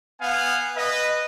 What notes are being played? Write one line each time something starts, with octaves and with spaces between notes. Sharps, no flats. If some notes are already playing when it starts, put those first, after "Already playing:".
B3 F5 F#5 G#5
B4 D#5